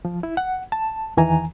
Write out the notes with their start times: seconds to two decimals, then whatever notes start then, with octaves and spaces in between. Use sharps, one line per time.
0.05 F3
0.23 E4
0.37 F#5
0.72 A5
1.17 E2 D#3 E3 G#5 A#5